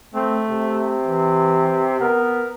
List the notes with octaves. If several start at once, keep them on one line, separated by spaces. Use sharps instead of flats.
A3 C4
C3
E3
B3 A#4